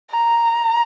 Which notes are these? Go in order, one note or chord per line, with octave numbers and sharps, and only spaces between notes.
A#5